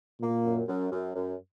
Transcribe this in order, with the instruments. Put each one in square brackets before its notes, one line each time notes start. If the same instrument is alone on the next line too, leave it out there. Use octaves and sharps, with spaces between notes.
[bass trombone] A#2 [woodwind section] A#3
[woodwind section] F#2
F#2
F#2
F#2